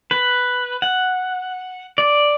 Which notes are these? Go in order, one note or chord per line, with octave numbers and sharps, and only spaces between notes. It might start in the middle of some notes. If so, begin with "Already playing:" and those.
B4
F#5
D5